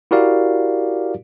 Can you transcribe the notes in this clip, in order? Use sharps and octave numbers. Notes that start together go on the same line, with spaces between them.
E4 F#4 G4 A#4 D5 F5